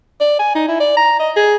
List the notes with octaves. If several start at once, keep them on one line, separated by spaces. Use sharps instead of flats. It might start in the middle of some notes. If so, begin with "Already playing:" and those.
D5
G#5
D#4
E4
D5
A#5
D#5
G#4